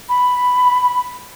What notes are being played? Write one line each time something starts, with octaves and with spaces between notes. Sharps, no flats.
B5